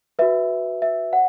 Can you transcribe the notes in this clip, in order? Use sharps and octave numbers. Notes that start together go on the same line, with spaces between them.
F#4 B4 E5
E5
C#5 F#5